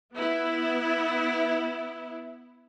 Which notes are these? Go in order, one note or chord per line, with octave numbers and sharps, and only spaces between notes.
B3 E4